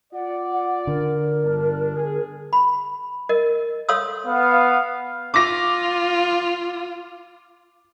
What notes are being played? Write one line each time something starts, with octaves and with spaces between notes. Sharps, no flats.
F4 D5 F#5
F#5
D3 A#4
G1 D4
G#4
B5
A#4 D#5
A4 C#5 F5 C6 D#6 E6
B3 F5
F4 D6 A#6